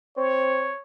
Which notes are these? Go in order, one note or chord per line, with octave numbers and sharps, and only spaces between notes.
C4 C#5